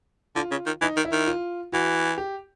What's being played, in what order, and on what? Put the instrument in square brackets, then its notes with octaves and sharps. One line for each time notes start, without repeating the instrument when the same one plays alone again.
[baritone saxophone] D3 [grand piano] F4
[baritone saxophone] C#3
D#3
[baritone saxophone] E3 [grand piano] D#4
[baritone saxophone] D#3
[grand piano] E4
[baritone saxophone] D#3
[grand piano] F4
[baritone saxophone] E3 [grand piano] F#4
[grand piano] G4